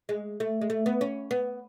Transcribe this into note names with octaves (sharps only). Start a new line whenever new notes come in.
G#3
A3
G#3
A3
B3
C#4
B3